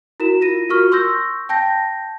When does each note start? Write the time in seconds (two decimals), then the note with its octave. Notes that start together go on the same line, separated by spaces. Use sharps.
0.20 E4 F#4 A#4 E7
0.41 F4 A#6 D#7
0.69 F4 F#4 A#4 C#6 F6
0.92 C6 C#6 E6 G6 A#6
1.49 G5 A5 G6 A#6